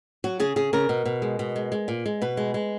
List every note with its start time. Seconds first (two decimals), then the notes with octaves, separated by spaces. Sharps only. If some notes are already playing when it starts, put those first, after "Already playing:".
0.24 F#3 F#4
0.40 C#3 G#4
0.56 C#3 G#4
0.73 C#3 A#4
0.89 B2
1.05 B2
1.22 G#3
1.39 B2
1.56 G#3
1.72 G#3
1.88 A#2
2.06 G#3
2.22 B2 B4
2.37 G#3
2.54 G#3